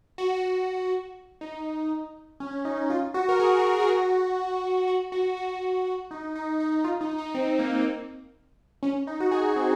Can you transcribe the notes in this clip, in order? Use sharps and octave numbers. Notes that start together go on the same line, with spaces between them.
F#4
F#4
D#4
C#4
D#4
F4
F#4
A#4
G#4
F#4
G#4
A#4
G#4
F#4
F#4
F#4
F#4
F#4
F#4
D#4
D#4
D#4
F4
D#4
D#4
C4
A#3
C#4
D#4
F#4
G#4
C4